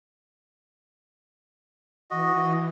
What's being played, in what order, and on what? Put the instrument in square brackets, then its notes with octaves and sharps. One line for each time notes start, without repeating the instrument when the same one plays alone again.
[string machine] E3 [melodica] F#4 D#5